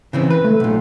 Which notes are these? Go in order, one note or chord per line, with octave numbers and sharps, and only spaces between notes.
C#3 E3 C4
B4
A3
B1 A#2